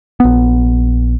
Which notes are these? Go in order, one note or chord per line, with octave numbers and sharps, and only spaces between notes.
A#1 B3